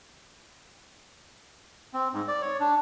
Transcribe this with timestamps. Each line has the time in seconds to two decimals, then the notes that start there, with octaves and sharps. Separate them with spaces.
1.94 C4
2.13 G#2
2.28 D5
2.42 C#5
2.60 D4